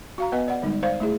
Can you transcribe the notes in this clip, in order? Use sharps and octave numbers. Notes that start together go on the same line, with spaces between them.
F#4 F5 A#5
B3 B4 D#5 G#5
D5 F#5
D3 G3 G#3 D#4
C5 D5 F5
A3 E4 G#4